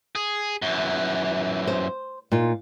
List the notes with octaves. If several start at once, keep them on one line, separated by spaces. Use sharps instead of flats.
G#4
F#2 E3
C5
A#2 D#4 F4